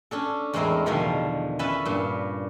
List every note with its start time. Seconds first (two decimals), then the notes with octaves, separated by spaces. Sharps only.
0.11 C#4 D4 A4
0.53 E2 A2 G#3 C4 E4 A#4
0.86 E2 B2 D3 D#3 F3
1.59 C#4 B4 E5 A5 B5
1.85 G2 A#2